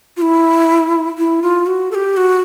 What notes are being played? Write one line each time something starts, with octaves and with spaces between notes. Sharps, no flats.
F4
E4
E4
F4
F#4
A4
G4
F#4